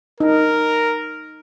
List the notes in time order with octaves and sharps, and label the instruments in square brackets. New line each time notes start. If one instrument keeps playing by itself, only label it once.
[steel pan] D#4 [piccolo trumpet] A#4